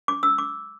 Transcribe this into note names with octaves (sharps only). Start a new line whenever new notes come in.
D6
E6
D6